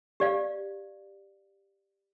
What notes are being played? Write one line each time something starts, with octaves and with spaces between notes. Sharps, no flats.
G4 D5 F5